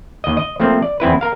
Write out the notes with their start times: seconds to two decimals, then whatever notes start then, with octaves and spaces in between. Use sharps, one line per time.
0.24 D#2 D#5
0.37 D#5
0.60 F3 A3 A#3 C4
0.82 D5
1.00 E2 C4 E4 B4
1.21 A#4 F5